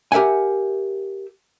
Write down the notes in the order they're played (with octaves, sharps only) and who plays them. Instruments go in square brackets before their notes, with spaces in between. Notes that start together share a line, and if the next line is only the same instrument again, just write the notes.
[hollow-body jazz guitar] G4 A#4 E5 F#5 G#5